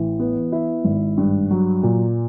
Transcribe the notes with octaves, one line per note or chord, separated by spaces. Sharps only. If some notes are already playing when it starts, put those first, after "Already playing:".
Already playing: A1 E3
B3
E4
G#1
G2
F#3
A#2